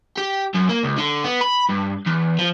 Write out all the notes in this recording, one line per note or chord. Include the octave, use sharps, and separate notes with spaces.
G4
F#2
A#3
C#2
D3
B3
B5
G2
E2
F3